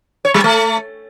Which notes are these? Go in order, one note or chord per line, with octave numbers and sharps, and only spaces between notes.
C#5
G3
A3